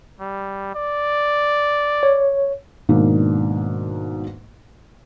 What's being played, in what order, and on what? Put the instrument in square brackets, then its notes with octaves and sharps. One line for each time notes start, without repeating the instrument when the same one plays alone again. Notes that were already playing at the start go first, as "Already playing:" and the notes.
[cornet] G3
D5
[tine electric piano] C#5
[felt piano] G#2 B2 D#3 A#3 D4